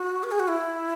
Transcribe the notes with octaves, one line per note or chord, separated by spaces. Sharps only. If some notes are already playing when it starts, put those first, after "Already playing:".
Already playing: F#4
B4
G#4
F#4
E4